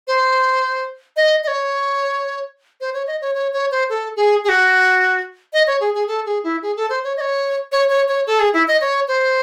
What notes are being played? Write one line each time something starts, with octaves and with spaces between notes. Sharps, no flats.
C5
D#5
D#5
C#5
C5
C#5
D#5
C#5
C#5
C#5
C5
A4
G#4
G#4
F#4
D#5
C#5
G#4
G#4
A4
G#4
E4
G#4
A4
C5
C#5
D#5
C#5
C#5
C#5
C#5
A4
G#4
E4
D#5
C#5
C5